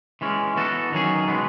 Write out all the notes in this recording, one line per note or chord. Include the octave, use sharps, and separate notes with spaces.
E3 G#3 C#4
E3 B3 F#4 A4
D#3 F#3 C#4 G#4
B2 G#3 B3